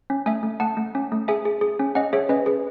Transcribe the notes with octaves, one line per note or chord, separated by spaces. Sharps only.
C#4
A3 E5 G#5
A3
A3 F#5 A5
A3
C#4
A3
G#4 E5 G#5
G#4
G#4
C#4
C#4 D#5 F#5
G#4 C#5 E5
C#4 B4 D#5
G#4 B4